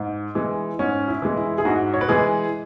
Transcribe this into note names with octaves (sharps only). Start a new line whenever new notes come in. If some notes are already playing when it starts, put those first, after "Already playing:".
Already playing: G#2
E3 G#3
G#2 C#4
E4
E3 G#3
E4
G#4
G#2 F#4
C#5
B4
E3 G#3 G#4